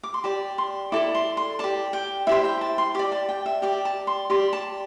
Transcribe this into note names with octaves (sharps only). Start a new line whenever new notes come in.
D6
C6
G4 D5 A5
C6
E4 A4 D5 D6
C6
C6
G4 D5 A5
G5
E4 G4 C5 E5
G5
A5
C6
G4 D5 D6
A5
G5
E5
G4 D5 G5
A5
C6
G4 D5 C6
A5